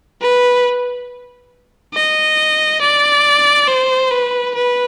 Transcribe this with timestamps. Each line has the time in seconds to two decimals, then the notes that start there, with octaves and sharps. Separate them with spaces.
0.21 B4
1.94 D#5
2.81 D5
3.68 C5
4.11 B4
4.55 B4